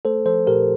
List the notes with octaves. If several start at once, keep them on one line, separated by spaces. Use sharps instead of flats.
A3 A4 C5
F3 A4 C5
A#2 G4 A#4